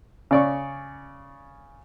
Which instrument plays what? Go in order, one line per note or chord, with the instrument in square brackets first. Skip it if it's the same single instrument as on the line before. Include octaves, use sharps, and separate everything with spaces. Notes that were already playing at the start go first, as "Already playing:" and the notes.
[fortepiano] C#3 D5 C#6